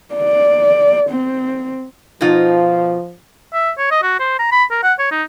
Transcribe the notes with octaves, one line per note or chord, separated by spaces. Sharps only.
D5
C4
B2 F3 D#4 F4
E5
C#5
D#5
F#4
C5
A#5
B5
A#4
F#5
C#5
D#4